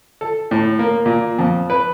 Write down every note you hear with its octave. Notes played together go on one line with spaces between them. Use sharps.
A4
A2
A#3
A#2
F2
B4